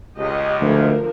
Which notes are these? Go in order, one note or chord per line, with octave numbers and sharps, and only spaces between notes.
C#2 G4 D#5
D2 D3 F3 A#4